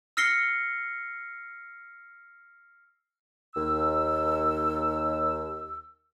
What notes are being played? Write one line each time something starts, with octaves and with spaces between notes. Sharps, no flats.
E6 F6 A#6 C7 C#7 G7
D#2 E6